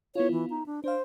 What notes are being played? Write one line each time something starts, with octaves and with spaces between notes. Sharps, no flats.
B3 E4 F4 C#5
E3
D#4
D4
D4 C5 F5